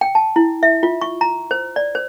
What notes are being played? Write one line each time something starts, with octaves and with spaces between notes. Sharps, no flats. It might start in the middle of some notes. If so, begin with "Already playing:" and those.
G5
A5
E4
E5
F4
C#6
A#5
C5
D5
C5